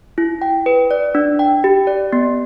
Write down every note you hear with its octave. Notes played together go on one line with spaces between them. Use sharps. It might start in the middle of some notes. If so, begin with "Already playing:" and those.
E4
G5
B4
D5
D4
G5
G4
D5
B3